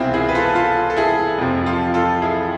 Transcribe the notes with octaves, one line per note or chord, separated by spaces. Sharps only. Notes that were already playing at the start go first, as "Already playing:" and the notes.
Already playing: C2 B2 C4 E4 F4 G#4
E4 G#4
B4
F4 A4
F4 A4
A4
E4 G#4
F2 C3 F3
F4 A4
F4 A4
E4 G#4